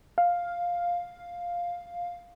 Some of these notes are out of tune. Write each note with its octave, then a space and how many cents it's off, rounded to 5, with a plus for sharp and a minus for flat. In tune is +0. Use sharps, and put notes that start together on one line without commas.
F5 +5